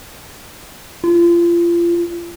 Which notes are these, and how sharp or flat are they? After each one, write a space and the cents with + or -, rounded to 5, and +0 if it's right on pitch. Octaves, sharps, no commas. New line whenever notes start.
F4 -30